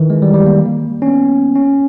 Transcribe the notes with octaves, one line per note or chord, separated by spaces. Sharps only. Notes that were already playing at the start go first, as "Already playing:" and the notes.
Already playing: D#3 E3
G#3
G3
G3
A#3
C#4
B3
C#4